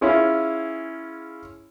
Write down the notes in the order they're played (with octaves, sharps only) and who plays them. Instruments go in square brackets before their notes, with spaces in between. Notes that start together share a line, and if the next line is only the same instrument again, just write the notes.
[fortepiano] C#4 E4 F4 G#4